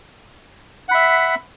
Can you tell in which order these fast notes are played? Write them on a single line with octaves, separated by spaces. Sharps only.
F#5 B5 E5